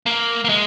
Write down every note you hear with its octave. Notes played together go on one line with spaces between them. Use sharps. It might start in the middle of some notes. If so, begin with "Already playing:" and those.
A#3
A#3
G#3